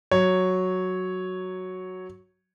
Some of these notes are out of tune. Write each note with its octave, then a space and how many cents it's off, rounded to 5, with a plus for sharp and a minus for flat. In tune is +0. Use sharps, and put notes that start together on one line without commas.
F#3 +0 C#5 +0